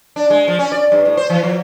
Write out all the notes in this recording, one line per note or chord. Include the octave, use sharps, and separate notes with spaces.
D4
G#3
F3
C#4
D5
G2
A2
C5
E3
F3